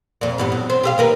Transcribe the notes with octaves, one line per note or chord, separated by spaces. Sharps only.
F2 A#2
E2 G2 B3
F#3
C4
G4 A4 F5
D#2 A#4 B4